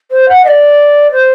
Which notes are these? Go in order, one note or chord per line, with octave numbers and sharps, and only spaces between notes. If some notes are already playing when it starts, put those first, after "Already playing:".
C5
F#5
D#5
D5
C5